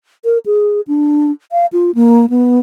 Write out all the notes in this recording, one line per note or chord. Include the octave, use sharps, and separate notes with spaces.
A#4
G#4
D4
F5
F4
A#3
B3